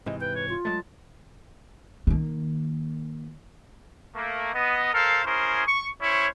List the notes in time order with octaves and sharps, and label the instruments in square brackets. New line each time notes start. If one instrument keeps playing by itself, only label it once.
[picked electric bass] G#2 C3 E3 [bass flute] D#5
[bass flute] B4 [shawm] G5
[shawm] C#5
[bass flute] F4
[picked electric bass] F#3 G#3 A3 [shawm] A5
[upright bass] D#3 A#3
[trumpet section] A3 A#3
B3 D#5
A4 A#4 C5 F5
C#4 E4 G#4 A#4 C5
C#6
C#4 E4 C5 C#5